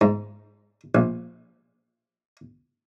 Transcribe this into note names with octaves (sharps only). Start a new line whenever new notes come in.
G#2
A#1